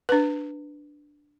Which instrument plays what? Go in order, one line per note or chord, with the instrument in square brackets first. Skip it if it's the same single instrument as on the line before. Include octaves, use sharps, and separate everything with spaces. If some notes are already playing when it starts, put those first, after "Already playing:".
[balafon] D4 B4